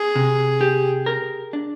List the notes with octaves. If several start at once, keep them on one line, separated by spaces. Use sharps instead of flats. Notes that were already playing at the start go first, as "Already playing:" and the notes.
Already playing: G#4
C3
G4
A#4
D4